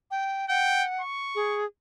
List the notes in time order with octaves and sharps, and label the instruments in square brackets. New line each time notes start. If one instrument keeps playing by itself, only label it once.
[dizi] G5
[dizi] F#5 [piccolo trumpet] G5
[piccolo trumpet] C#6
[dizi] G#4